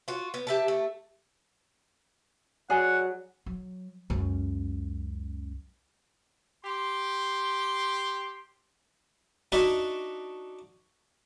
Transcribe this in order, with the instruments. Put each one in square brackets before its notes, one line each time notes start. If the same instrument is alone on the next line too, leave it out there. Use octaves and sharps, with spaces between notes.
[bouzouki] F4 F#4
B3
G4 E5 A5
A3
[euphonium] F#3 [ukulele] G#4 D5 G#5 [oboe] F#5
[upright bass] F#3
C#2 F#2
[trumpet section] G4 C6
[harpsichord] D4 D#4 F#4 D#5 E5